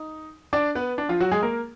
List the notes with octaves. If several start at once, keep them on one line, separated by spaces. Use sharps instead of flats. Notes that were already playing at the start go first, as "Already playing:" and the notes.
Already playing: D#4
D4 D5
B3 B4
D4
F3 F4
F#3 F#4
G#3 G#4
A#3 A#4